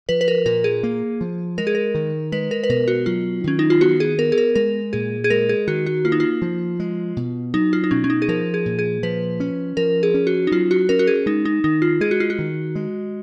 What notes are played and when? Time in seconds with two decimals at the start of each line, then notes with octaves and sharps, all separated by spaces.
0.09 F3 B4
0.21 B4
0.28 A#4
0.46 A#2 A#4
0.64 G#4
0.83 A#3
1.21 F3
1.58 G#3 A#4
1.67 G#4
1.75 A#4
1.95 D#3
2.32 G#3 B4
2.51 A#4
2.63 B4
2.69 B2 A#4
2.88 F#4
3.06 F#3 F4
3.44 D#3 C#4
3.59 D#4
3.70 F4
3.81 B3 F#4
4.00 G#4
4.18 B3 A#4
4.32 G#4
4.38 A#4
4.55 G#3 A#4
4.93 A#2 G#4
5.24 G#4
5.30 G#3 A#4
5.49 G#4
5.68 D#3 F#4
5.86 F#4
6.04 A#3 F4
6.12 D#4
6.20 F4
6.42 F3
6.80 G#3
7.17 B2
7.54 F#3 D#4
7.73 F4
7.84 D#4
7.91 B2 C#4
8.04 C#4
8.10 D#4
8.22 G#4
8.28 F3 A#4
8.54 G#4
8.66 A#2
8.79 G#4
9.03 F3 B4
9.40 C#4
9.77 F3 A#4
10.03 G#4
10.14 C#4
10.27 F#4
10.47 D#4
10.52 F#3 F4
10.71 F#4
10.89 C#4 A#4
10.99 F#4
11.07 G#4
11.26 G#3 D#4
11.45 D#4
11.64 D#3 D#4
11.82 F4
12.01 G#3 G#4
12.11 F#4
12.20 F4
12.30 F#4
12.39 D#3
12.75 G#3